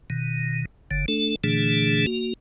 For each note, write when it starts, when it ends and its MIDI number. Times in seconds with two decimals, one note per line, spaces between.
0.10 0.65 47
0.10 0.65 51
0.91 1.05 30
0.91 1.05 50
1.08 1.36 57
1.08 1.36 62
1.08 1.36 69
1.44 2.06 46
1.44 2.06 50
1.44 2.06 52
1.44 2.06 57
1.44 2.06 62
1.44 2.06 68
2.07 2.33 58
2.07 2.33 66